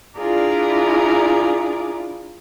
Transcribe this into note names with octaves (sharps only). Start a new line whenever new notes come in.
D4 E4 F4 G#4 A#4 D5